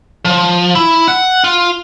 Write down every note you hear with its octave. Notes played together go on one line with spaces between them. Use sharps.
F3
E4
F#5
F4